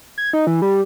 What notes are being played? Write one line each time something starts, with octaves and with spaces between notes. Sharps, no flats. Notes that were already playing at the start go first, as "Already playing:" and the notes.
G#6
D#4
E3
G3